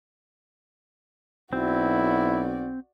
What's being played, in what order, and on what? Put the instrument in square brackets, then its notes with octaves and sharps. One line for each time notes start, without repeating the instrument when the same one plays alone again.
[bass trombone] B1 [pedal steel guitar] C4 [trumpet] E4 [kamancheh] F#4 D5